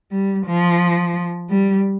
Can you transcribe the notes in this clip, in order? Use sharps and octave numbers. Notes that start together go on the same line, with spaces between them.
G3
F3
G3